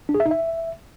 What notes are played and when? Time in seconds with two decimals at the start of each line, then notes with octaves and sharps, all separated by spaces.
0.09 D4
0.14 G#4
0.20 E5
0.25 D#4
0.31 E5